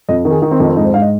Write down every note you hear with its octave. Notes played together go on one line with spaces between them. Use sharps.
F2 D#5
D#3
G#4
D#3
C4
F2 D#4
C4
G#2 D#4
C5
G#2 F5
D#5